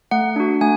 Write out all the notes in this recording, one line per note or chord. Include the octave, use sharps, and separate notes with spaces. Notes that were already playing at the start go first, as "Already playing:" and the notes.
A3 F#5
D4 F#4
A3 G#5